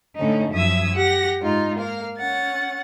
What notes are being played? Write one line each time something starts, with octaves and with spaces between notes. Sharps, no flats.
A2 D3 C#4 D#4
F#2 F3 E5 D#6 E6 G#6
G4 F#5 A#6
G#2 D#4 F4
A#3 F5
C#4 F#5 A6